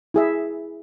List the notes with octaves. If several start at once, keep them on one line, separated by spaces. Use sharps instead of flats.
E4 G#4 E5